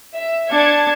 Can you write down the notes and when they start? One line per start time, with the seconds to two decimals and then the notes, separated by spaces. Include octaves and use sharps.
0.14 E5
0.51 D4 A5 G#6 C#7